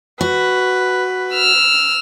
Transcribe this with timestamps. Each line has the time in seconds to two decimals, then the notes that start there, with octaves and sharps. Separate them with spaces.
0.21 F#4 B4
1.34 E6 F6